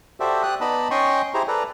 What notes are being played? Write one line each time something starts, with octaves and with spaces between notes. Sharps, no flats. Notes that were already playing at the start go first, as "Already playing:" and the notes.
F#4 G4 A4 C5 D5 E5
G4 D#6 F#6
B3 D#4 D5 D#5 A5 B5
C#4 D#5 G5 C6 C#6 D#6
E4 G4 G#4 C5 A#5
A4 B4 D5 A#5